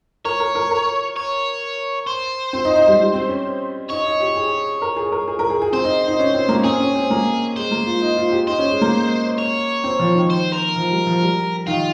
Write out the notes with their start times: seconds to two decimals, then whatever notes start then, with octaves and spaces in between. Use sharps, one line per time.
0.25 A#4 C#5
0.40 A#4
0.55 A#4
0.71 A#4
1.16 C#5
2.07 C5
2.53 C4
2.65 D#4
2.76 D#4
2.87 G3
2.99 G3
3.14 C4
3.29 C#4
3.90 D#4 C#5
4.06 D#4
4.20 G4
4.36 G#4
4.82 A#4
4.96 G#4
5.12 A#4
5.28 G#4
5.39 A#4
5.50 G#4
5.62 G#4
5.73 C4 C5
5.84 D#4
6.07 D#4
6.19 C#4
6.34 C4
6.49 A#3
6.59 C#4
6.64 C4 G#4
6.80 C#4
6.95 C4
7.10 A#3
7.56 G#3 C5
7.71 A#3
7.86 F4
8.02 D#4
8.17 F4
8.32 G4
8.47 D#4 C5
8.59 C#4
8.70 G#3
8.81 A#3
9.38 C#5
9.84 C4
9.99 F3
10.14 D#3
10.30 C5
10.53 A#4
10.76 F3
10.91 G3
11.06 F3
11.22 G3
11.67 D#3 F4